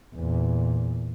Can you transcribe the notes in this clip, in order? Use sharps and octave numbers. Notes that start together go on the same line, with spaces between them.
E2 A#2